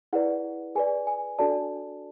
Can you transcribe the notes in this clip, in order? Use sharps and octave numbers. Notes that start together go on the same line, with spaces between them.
E4 G#4 B4 D5 F#5
G#4 B4 D5 G#5
G#5
D4 F#4 A4 D5 A5